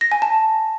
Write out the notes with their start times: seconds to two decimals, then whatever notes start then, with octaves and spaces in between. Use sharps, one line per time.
0.01 A#6
0.12 G#5
0.22 A5